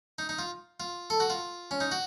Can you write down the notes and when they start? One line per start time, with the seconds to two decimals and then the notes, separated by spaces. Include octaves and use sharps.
0.18 D#4
0.29 D#4
0.39 F4
0.80 F4
1.10 A4
1.20 F#4
1.30 F4
1.71 C#4
1.80 D#4
1.92 F#4